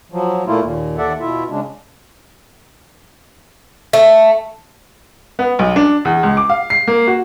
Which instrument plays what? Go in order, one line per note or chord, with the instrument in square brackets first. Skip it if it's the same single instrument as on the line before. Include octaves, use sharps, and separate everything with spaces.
[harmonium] F3 F#3
A#2 A3 A#3 E4 F4
D#2 A#2
D#2 A4 D5 E5 F#5
B2 E4 F4 E5
C#3 G#3 D4
[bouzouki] A3
[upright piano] B3
B1
D4
E2
C#2
D6
F5
C7
A#3
F#4